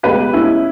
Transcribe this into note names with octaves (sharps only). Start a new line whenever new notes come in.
C#2 B2 G4 B4
C#4 E4